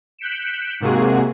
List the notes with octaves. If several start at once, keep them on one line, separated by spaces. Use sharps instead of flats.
F#6 G6 B6 C#7 D7 E7
G#2 C3 A#3 F#4 G#4